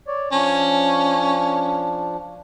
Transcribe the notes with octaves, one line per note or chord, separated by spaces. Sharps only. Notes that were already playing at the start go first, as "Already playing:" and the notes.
C#5 D5
F3 C#4 D4